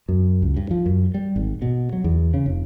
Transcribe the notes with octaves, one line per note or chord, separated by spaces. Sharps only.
F#2
C#2
G2
F3
F#2
G3
G#1
B2
F#3
E2
C#3
F1